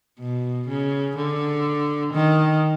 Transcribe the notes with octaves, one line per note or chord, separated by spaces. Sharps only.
B2
C#3
D3
D#3